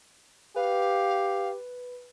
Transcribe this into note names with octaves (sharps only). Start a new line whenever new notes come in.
G4 B4 F5